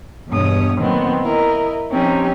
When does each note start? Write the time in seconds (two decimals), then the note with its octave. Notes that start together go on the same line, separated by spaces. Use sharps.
0.29 E2 G2 B2 C#5 D#6
0.77 A#2 D#3 F#3 B3 C4
1.23 E4 A#4 D#5
1.90 F3 C4 C#4 D#4 G4